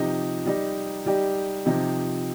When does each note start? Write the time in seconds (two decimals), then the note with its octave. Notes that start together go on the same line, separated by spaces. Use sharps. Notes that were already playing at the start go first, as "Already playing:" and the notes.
Already playing: C3 F3 D#4 G4
0.46 G3 D#4 G4
1.06 G3 D#4 G4
1.66 C3 F3 D#4 G4